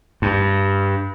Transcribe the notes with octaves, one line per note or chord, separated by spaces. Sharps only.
G2